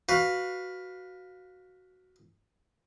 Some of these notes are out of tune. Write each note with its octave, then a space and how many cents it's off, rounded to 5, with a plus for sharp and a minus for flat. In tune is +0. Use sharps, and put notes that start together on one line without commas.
F#4 +0 B4 +0 F5 +15